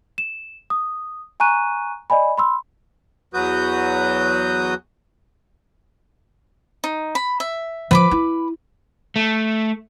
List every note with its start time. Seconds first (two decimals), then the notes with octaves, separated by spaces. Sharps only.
0.18 E7
0.70 D#6
1.40 G#5 A#5 C#6 F#6 D#7
2.10 D5 D#5 G#5 B5
2.38 B5 C6 E6
3.34 E2 F#3 F#4 B4 D#6 G6
6.84 D#4
7.15 B5
7.40 E5
7.91 F3 B4 B5 D6
8.11 E4
9.16 A3